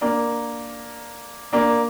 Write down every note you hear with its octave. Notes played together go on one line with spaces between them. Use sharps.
A#3 D4
A#3 D4